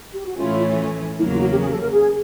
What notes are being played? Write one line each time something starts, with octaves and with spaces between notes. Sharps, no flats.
G4
F#4
A2 E3 A3 C#4 F4
E2 C#3 F#3 A#3 E4
F4
F#4
G4
G#4
A4
A#4
G#4